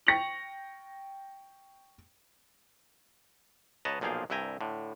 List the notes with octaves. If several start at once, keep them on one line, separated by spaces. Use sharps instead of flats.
G5 C#6 A#6 C#7 F7 F#7
C#2 B4 C#5 D#5 A5 A#5
B1 A#2 F3 G#4 F5 G5
C2 G2 E5 G5 G#5 A#5
A2 D3